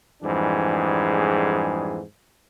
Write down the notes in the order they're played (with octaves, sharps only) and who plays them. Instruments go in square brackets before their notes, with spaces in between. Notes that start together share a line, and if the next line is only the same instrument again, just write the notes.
[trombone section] F2 G#2 E3 G3 D4 G#4